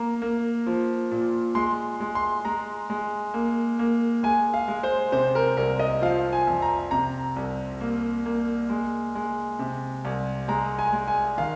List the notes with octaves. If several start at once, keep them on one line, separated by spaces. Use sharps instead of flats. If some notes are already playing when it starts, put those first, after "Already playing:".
Already playing: A#3 A#5
A#3
F3
A#2
G#3 C6
G#3
C6
G#3 A#5
G#3
A#3
A#3
G#3 G#5
F5
G#3
C5
C3 C5
A#4
C2 A#4
D#5
F3 F5
G#5
F2
A#5
C3 A#5
C2
A#3
A#3
G#3
G#3
C3
C2
G#3 A#5
G#5
G#3
G#5
D#3 F5